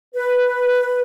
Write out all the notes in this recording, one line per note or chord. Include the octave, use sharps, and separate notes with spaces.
B4